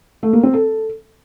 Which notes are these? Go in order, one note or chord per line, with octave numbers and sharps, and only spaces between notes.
A3
A#3
C4
A4